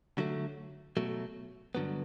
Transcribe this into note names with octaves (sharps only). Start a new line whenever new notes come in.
D3 F#3 A3
B2 F#3 A3
G2 D3 F#3 B3